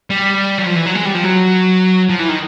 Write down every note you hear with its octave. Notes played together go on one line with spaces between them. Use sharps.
G3
F#3
F3
E3
F#3
G#3
G3
F3
F#3
F3
E3
D#3